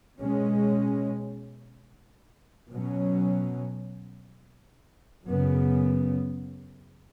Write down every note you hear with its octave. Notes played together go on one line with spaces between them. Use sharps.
B2 G#3 C#4
B2 F#3 C#4
F#2 C#3 B3